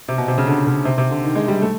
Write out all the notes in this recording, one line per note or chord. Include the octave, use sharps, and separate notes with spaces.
C3
B2
C3
C#3
D3
C#3
C3
C3
D3
D#3
G#3
G3
A3